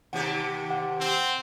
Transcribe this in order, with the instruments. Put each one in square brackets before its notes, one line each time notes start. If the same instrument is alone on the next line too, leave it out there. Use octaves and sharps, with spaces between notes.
[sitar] D#2 C3 G4 [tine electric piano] F#5
[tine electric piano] F#5
[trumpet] C4